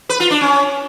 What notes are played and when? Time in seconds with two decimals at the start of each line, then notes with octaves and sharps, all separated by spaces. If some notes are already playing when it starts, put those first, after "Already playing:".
0.09 B4
0.20 F4
0.31 D4
0.41 C#4